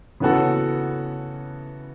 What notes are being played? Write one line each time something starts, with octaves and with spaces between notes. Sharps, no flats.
C#3 E3 B3 F#4 A4